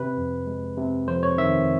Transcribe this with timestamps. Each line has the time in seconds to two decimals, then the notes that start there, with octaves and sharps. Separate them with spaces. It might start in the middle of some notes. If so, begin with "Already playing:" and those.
Already playing: C3 B4
0.17 F2
0.47 G#3
0.77 C3
1.08 F2 C5
1.23 C#5
1.38 D#3 E5